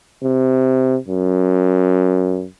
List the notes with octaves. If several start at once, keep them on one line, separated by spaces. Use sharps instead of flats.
C3
F#2